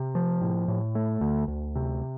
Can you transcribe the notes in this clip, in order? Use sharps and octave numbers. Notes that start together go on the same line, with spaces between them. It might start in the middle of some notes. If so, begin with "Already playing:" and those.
Already playing: C3
F3
A2
A2
A3
D2
D2
C3